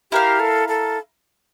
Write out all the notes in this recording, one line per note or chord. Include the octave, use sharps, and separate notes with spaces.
E4 G4 A#4 F5
A4
A4